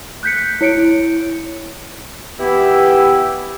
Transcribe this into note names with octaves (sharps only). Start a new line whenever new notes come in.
F#6 G6 B6 C#7
E4 C#5 C#7 D7
E3 B3 E4 G4